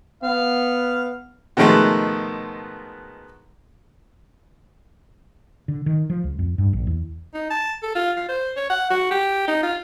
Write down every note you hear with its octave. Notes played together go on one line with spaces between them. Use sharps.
B3 F5
B2 D#3 F3 G#3 A3 B3
D3
D#3
F3
C#2
F2
G2
A#1
E2
D#4
A5
A4
F4
F4
C5
C#5
F#5
F#4
G4
D#4
F4